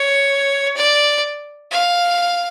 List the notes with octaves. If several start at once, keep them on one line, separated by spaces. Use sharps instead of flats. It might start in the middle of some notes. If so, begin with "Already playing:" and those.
Already playing: C#5
D5
F5